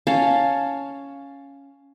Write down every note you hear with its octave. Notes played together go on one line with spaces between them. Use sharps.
C#4 C#5 F5 A5